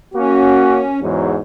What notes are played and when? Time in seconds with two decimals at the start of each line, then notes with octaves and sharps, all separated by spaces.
0.15 A#3 C#4 F#4
1.01 E2 G#2 F#3